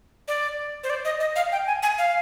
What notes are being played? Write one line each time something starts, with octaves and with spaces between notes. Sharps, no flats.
D5
C5
D5
D#5
D#5
F5
G5
G#5
G#5
F5